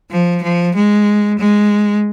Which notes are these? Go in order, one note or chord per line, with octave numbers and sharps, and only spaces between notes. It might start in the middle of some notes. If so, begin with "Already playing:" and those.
F3
F3
G#3
G#3